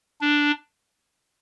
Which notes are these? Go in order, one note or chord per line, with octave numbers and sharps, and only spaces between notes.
D4